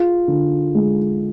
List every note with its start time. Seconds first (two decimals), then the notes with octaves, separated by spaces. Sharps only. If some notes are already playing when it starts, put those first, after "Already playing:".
Already playing: F4 G#4
0.28 D3
0.75 G#3